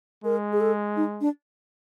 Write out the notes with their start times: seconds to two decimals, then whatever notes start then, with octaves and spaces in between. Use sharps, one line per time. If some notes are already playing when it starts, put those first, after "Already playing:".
0.24 G#3 A#4
0.52 G#4
0.60 A4
0.96 D#4
1.21 D4